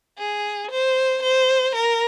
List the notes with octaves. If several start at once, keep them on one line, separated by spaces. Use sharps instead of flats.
G#4
C5
C5
A#4